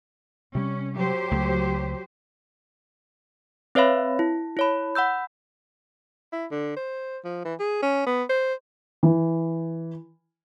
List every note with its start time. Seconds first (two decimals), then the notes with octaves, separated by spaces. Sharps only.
0.55 C3 G3 C#4
0.95 F#3 G4 C5
1.31 C#2 A3
3.75 C4 B4 C#5 E5 F5 B5
4.19 E4
4.57 E4 C#5 B5
4.95 F#5 B5 E6 G6
6.32 E4
6.51 D3
6.76 C5
7.24 F3
7.45 E3
7.60 G#4
7.82 C#4
8.06 B3
8.29 C5
9.03 E3